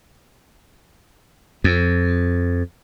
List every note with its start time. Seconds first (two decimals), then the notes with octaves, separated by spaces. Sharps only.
1.64 F2